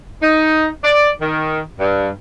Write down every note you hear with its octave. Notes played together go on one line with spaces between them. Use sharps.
D#4
D5
D#3
G2